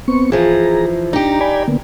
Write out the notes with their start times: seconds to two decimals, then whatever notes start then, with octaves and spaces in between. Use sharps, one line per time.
0.08 B3 C4 C#6
0.32 E3 F3 G#4 A#5
1.13 D4 D#4 G4 A#5
1.41 D5 G#5 B5
1.68 D3 A#3 B3